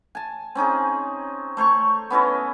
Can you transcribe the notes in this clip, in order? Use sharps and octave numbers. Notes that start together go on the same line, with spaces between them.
G#5 A5
C4 C#4 D#4 G#4
A3 C5 C#5 C#6
B3 C#4 E4 D#5